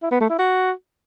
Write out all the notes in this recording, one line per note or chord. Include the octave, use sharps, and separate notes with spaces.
E4
B3
A3
E4
F#4